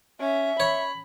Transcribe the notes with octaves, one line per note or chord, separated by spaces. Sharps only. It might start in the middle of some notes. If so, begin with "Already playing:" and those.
C#4 E5
C#5 B5